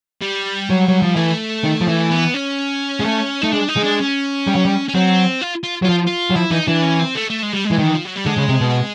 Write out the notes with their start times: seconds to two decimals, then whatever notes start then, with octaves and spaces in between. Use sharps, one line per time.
0.21 G3
0.70 F#3
0.88 F#3
1.02 F3
1.16 E3 A3
1.64 D#3
1.81 F3
1.88 E3
2.11 B3
2.34 C#4
3.00 G#3
3.05 A3
3.42 A3 D#4
3.52 G#3 D4
3.69 D#4
3.77 G#3
3.84 D4
4.00 C#4
4.47 G3
4.55 F#3
4.65 G3
4.88 C#4
4.95 F#3 C4
5.41 F4
5.64 F4
5.82 F#3
5.85 F3 F4
6.07 F4
6.30 F#3
6.36 F3 E4
6.51 E3 D#4
6.68 E3 D4
6.83 C#4
7.00 C4
7.15 A3
7.30 A3
7.43 G#3
7.53 G3
7.65 G#3
7.71 E3
7.78 D#3
7.84 E3
7.95 F3
8.05 F#3
8.15 G3
8.26 D3 G#3
8.37 C#3
8.49 C3
8.61 B2